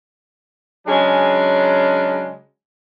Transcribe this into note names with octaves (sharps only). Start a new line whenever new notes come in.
C#3 F#3 G#3 C#4 D4